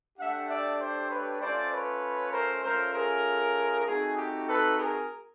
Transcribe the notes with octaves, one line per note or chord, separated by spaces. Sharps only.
A3 D4 G4 E5 F#5
D5 E5
C5 D5
B4 C#5
A3 C#4 F4 C5 D5
B4 C#5
A#4 C5
A3 C#4 F4 A#4 C5
G#4 A#4
A3 C4 D#4 F#4 G#4
G4
A4 B4
G#4 A#4